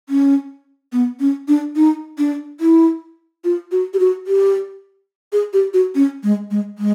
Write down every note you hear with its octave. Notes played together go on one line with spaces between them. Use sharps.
C#4
B3
C#4
D4
D#4
D4
E4
F4
F#4
G4
F#4
G4
G#4
G4
F#4
C#4
G#3
G#3
G#3